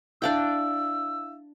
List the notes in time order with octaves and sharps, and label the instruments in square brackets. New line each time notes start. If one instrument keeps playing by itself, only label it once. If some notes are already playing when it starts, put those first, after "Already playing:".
[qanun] D4 D5 G5 [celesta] E4 E5 F5 [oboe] E6